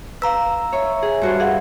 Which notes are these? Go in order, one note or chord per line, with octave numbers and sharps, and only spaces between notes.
B4 F5 A#5 E6
C#5 E5
G#4
G2 F#4 C5
G#4 F5 F#5